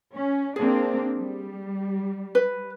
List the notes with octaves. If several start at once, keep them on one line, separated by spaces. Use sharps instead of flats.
C#4
A#3 C4 D4 G#4
G3
B4